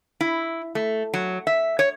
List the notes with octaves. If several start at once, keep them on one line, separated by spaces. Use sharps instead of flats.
E4
A3
F#3
E5
C#5